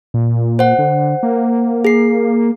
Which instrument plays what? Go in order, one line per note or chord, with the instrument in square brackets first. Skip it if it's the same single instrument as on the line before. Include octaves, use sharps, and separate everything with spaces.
[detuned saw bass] A#2
[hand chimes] C5 F#5
[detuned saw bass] D3
A#3
[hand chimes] G#4 C7